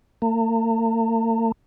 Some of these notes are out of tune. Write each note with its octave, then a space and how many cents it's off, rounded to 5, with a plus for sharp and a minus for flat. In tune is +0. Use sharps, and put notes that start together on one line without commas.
A#3 -45